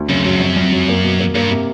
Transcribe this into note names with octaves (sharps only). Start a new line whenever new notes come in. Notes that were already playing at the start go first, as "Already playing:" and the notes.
Already playing: D2
F#2 C#3
F#2 F#3
F2
F2
F#3
A#3
B2
A#3
G2 A#3
C3